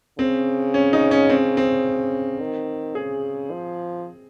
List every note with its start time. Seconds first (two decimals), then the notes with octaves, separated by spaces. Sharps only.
0.19 C#3 C4
0.74 C#4
0.93 D#4
1.11 C#4
1.29 C4
1.57 C4
2.40 D#3
2.95 C#3 G#4
3.51 F3